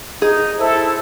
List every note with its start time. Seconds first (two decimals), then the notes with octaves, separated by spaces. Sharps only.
0.22 D#4 G#4
0.59 E4 A4 C5